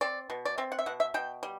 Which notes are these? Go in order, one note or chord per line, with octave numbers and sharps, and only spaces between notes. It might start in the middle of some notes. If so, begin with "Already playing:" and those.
C4 D5
B2
D5
C4 E5
F#5
E5
B2 F#5
E5
B2 G5
G3